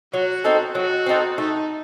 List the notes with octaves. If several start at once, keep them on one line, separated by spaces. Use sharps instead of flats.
F#3 F#4
C4 D#4 A4
F#3 F#4
C4 D#4 A4
A3 D#4